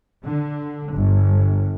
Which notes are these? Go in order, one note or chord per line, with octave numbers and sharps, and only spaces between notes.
D3
G1